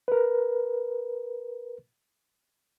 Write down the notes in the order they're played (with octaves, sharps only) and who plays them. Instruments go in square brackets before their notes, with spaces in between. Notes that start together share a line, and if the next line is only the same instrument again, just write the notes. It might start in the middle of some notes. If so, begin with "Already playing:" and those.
[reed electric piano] A#4 B4